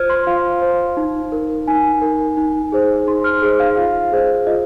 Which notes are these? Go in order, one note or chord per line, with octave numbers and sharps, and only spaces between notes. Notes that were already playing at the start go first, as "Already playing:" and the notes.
Already playing: F4 C5 F6 G#6
C6
F4 F5
C5
D#4
A#4
D#4 G#5
A#4
D#4
G#4 C5
D#4 C6
F6
G#4 C5
F5
F4 F5
G#4 C5
F4 D#5